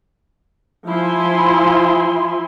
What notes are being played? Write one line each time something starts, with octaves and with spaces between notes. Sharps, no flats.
F3 E4 G#5 C6